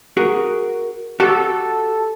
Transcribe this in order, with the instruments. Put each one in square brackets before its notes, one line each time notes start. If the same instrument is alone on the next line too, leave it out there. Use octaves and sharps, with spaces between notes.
[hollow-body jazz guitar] F#4 G#4 A#4
[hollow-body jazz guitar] F#4 G4 [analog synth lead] A4